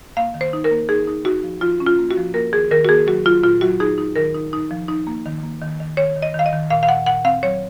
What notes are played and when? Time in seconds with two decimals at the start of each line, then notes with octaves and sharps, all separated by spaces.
0.17 A#3 F5
0.34 D#3
0.41 C5
0.53 D#4
0.64 A#4
0.71 A#3
0.89 D#4 G#4
1.07 D#4
1.25 D#4 F#4
1.44 F3
1.61 F3 F4
1.80 C#4
1.86 F4
1.99 A#3
2.11 F#4
2.17 F3
2.34 A#3 A#4
2.53 D#3 G#4
2.71 D#3 A#4
2.85 F#4
2.89 A#3 G#4
3.07 F#3 F#4
3.26 F#3 F4
3.43 A#2 F4
3.61 F#3 F#4
3.80 D#4 G#4
3.98 D#4
4.16 D#3 A#4
4.35 D#4
4.53 D#4
4.71 F3
4.88 D#4
5.07 A#3
5.25 D#3
5.43 A#3
5.62 D#3
5.80 D#3
5.97 D#3 C#5
6.16 D#3
6.22 D#5
6.35 D#3 F5
6.46 D#5
6.53 D#3
6.70 A#2 F5
6.83 F5
6.89 A#2 F#5
7.06 A#2 F#5
7.25 C4 F5
7.43 F#3 C#5